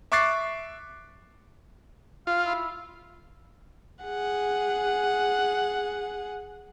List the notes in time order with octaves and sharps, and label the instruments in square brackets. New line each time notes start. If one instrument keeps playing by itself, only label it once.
[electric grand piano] E5 C#6 D6 F#6 A6 C7
[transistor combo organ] F4 [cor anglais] F5
[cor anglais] E4
[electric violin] G#4 F#5